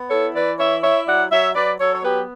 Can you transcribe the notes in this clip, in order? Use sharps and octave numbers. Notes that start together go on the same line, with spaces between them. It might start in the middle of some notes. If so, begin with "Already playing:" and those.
Already playing: B3
E4 A4 C#5
E3 B4 D5
E4 C#5 E5
E4 C#5 E5
F#3 D5 F#5
F#3 C#5 E5
F#3 B4 D5
F#3 A4 C#5
C#5
B3 G4 B4